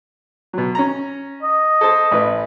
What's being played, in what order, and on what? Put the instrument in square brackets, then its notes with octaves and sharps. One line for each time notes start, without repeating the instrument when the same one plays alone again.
[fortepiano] B2 F#3
C#4 A#5
[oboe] D#5
[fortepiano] A4 C5 A5
A1 B4